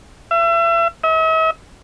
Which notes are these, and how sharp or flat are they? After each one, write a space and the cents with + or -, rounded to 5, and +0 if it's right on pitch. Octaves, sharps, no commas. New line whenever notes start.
E5 +35
E5 -45